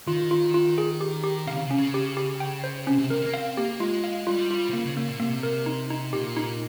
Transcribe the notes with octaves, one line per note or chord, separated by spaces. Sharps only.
D#3 F4
F4
F4
G#4
G4
G4
C3 F5
C#3
C3
C#4
C#3
G4
G4
G5
C5
C3 C#4
C3
C3 A#4
A#3
C4 F5
A#3 G4
G#3 F4
F5
G3 F4
F4
C3
C#3 A#3
C#3
C#3 A#3
A#2
C3 A#3
A#4
D#4
D#4
A#2 G4
D#4